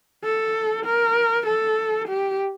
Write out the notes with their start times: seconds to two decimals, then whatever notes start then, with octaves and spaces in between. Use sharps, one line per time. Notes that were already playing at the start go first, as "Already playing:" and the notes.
0.24 A4
0.86 A#4
1.46 A4
2.08 G4